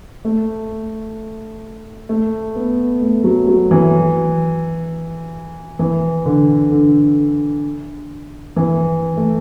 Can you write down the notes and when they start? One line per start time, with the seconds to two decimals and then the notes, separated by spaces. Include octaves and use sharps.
0.25 A3
2.09 A3
2.55 B3
3.01 A3
3.24 F#3
3.47 F#3
3.71 E3
5.79 E3
6.25 D3
6.71 D3
8.56 E3
9.17 A3